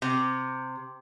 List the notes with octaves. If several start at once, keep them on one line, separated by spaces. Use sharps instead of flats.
C3